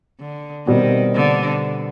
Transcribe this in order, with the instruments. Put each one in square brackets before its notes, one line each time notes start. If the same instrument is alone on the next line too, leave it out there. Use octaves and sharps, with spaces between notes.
[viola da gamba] D3
[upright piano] B2 G3 C4 [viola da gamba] D#3
[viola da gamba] D3